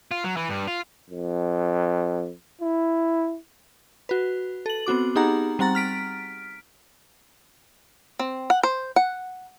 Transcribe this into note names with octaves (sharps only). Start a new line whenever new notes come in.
F4
F#3
E3
G2
F4
F2
E4
F#4 B4
A4 F#7
B3 C4 F#4 D6
B3 D#4 G4 G#4 F#5 A#5
G3 C4 F#5 A#5 A6
F6 B6 D7
C4
F#5
C5
F#5